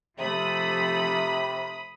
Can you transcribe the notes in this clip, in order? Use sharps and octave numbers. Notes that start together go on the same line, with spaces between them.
C3 F3 A3 B5 D#6